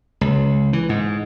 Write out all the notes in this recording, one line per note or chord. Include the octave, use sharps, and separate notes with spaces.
C#2
E3
G#2